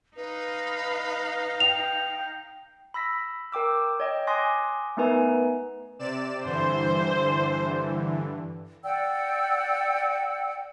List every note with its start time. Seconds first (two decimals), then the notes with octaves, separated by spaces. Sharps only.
0.17 D#4 B4 F5
1.60 G5 F7
2.94 B5 E6 A#6 B6
3.52 A#4 G5 D6 E6
4.00 C#5 D#5 G5
4.27 G#5 C6 D6 D#6 F#6 A#6
4.97 A3 B3 D#4 A#4 B4 G#5
5.99 C3 D5 E7
6.44 G2 D3 E3 C5
8.83 D5 F#5 G5 E6